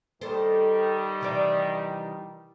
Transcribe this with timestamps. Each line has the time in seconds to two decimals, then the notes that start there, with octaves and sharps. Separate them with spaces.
0.21 D#3 G3 A4 C5
1.21 C3 E3 D5